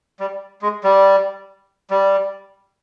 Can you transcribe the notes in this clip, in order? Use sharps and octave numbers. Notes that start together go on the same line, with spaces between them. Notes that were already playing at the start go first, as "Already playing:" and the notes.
G3
G#3
G3
G3